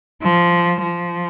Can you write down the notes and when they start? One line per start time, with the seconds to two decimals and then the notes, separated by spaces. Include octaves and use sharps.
0.23 F3
0.83 F3